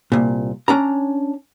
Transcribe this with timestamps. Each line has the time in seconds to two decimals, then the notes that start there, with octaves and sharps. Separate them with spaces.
0.12 C2 A#2
0.68 C#4 D4 A#5